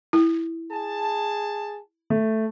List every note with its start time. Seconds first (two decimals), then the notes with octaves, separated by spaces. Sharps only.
0.13 E4
0.72 G#4 A5
2.10 A3